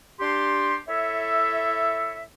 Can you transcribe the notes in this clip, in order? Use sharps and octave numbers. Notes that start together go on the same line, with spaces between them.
D4 G4 C6
E4 A4 C#5 E5